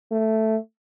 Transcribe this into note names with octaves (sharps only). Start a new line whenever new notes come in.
A3